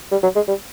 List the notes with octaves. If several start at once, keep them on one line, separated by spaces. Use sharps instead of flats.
G3
F#3
G#3
G3